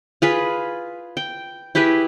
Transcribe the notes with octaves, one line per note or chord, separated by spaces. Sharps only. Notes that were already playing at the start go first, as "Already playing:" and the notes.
F4 G#4 B4
G5
E4 G4 G#4 B4